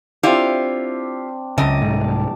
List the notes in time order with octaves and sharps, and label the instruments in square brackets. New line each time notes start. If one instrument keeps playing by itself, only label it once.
[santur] C4 D4 [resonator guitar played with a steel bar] E4 F4 G4
[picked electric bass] C#2 C#3 [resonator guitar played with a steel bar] F#2 D#5 [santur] A5 D6
[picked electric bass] C2 G#2